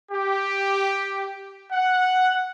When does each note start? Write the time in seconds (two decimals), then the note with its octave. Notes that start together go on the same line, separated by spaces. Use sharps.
0.11 G4
1.72 F#5